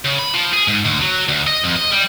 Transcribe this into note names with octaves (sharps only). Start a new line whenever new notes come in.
C#3
B5
F3
G#4
G#2
D2
F#3
D2
D#5
F2
D#5
G3